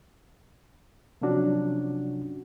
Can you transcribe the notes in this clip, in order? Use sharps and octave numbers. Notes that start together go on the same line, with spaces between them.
C3 F3 F#3 C#4 D4 F#4